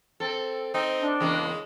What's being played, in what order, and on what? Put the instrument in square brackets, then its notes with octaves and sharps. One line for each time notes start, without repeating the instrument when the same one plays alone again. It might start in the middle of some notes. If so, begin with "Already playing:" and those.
[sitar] C4 A4
[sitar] C4 [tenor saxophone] D#4
[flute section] D4
[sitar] E2 C#3 A#3 [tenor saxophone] G#3